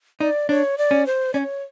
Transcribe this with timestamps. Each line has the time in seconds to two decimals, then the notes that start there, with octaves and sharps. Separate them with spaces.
0.20 D#4 D5
0.49 D4 C#5
0.78 D5
0.91 C#4
1.06 C5
1.34 C#4 C#5 D5